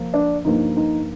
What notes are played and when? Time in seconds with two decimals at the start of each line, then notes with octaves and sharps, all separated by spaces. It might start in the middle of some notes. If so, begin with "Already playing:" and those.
Already playing: F3 A#3
0.14 D4
0.45 G2 F3 A#3 D#4
0.77 D#4